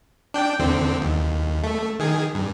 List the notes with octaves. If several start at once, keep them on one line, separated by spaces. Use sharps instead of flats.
D4 G5
E2 D3 C4
D#2
A3
D#3 G#4
G2